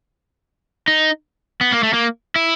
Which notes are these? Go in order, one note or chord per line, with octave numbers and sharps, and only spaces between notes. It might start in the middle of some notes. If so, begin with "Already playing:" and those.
D#4
B3
A#3
A3
A#3
E4